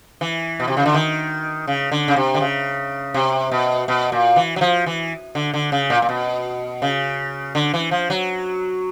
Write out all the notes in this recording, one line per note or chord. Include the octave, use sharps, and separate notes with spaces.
E3
B2
C3
C#3
D3
D#3
C#3
D3
C#3
C3
D3
C#3
C3
B2
B2
A#2
E3
F#3
F3
E3
D3
D3
C#3
A#2
A#2
B2
C#3
D3
E3
F3
F#3